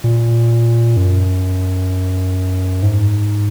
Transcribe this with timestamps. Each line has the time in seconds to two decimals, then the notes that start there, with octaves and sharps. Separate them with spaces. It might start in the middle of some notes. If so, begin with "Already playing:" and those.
0.04 A#2
0.97 F#2
2.83 G#2